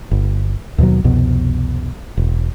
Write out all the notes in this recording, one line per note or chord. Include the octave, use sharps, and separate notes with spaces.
G1
D#2 B2 D#3 F#3
C2 F2 B2
E1